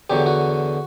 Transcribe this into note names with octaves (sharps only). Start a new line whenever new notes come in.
E2 D3 F#3 G4
F#4